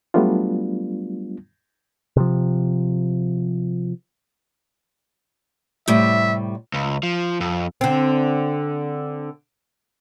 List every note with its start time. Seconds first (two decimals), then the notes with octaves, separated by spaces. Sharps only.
0.14 F#3 G3 A3 B3 D4 F4
2.17 C3 F3
5.88 A2 C3 G3 E5
6.74 C#2
7.03 F3
7.40 F2
7.81 D3 C4